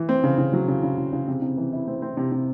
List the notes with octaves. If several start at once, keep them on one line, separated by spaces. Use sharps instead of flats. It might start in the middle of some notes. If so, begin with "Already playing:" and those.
Already playing: E3
C4
C#3
C#3
F#3
C#3
C#3
C#3
C#3
C3
C3
E3
E4
C4
C4
C3
C3